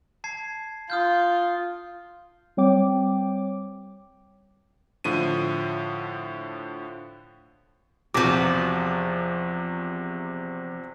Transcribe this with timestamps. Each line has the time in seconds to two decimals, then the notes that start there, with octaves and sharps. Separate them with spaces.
0.24 A5 G#6 C7
0.90 F4 D#6 F6 G6
2.57 G3 C4 C#5 G5 D6
5.04 A2 D3 F3 D#7
8.14 E2 C3 F3 F#4 D6